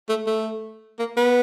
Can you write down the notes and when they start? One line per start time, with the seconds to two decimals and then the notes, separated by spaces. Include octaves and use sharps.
0.09 A3
0.26 A3
0.99 A#3
1.17 B3